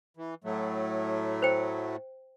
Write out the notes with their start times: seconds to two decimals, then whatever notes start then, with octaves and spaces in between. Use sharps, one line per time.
0.17 E3
0.44 A2 F#3 A3
1.42 C5 G5